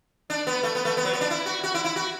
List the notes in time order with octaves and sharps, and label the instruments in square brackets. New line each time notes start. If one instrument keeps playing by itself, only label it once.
[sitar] D4
B3
A3
B3
A3
B3
F#3
B3
D4
E4
F#4
F#4
E4
E4
F#4